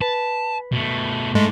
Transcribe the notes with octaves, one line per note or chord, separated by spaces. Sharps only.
B4 A5
B2 A3
G#2 G#3 A3 A4